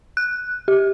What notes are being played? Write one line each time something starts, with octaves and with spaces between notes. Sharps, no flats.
F#6
G4